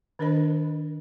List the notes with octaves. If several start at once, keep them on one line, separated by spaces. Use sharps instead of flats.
D#3 D4 A#4 C5 D#5 B5